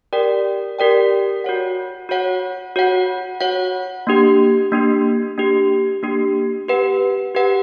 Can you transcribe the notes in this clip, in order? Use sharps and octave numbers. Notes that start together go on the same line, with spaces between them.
G4 A#4 D5 G5
G4 A#4 D5 G5
F#4 C#5 F#5
F#4 C#5 F#5
F#4 C#5 F#5
F#4 C#5 F#5
A#3 D4 G4
A#3 D4 G4
A#3 D4 G4
A#3 D4 G4
G4 B4 F#5
G4 B4 F#5